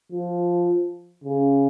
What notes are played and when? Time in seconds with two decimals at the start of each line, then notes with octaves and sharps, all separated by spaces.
0.12 F3
1.24 C#3